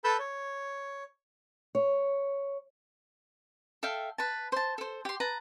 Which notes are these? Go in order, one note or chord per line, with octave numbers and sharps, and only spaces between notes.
A4 B4 A5 B5 E6 G6
C#5
C#5
A4 E5 F5 G5
B4 A5
C5 A5
A4 C5
G4 C6
B4 A5 A#5